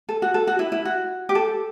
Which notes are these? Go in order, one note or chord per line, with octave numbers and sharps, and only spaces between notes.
A4
F#4
A4
F#4
E4
E4
F#4
G4
A4